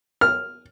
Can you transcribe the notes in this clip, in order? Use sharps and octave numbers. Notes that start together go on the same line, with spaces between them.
F6